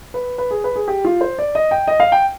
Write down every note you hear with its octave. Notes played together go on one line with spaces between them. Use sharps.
B4
B4
G#4
B4
G#4
G4
F4
C5
D5
D#5
G5
D#5
F5
G5